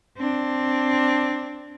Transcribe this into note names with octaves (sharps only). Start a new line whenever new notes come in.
C4 D4